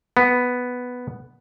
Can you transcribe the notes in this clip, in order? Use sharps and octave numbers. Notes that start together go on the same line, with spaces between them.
B3